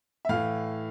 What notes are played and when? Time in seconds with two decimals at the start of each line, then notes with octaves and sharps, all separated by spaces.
0.25 E5
0.29 A2 E3 F5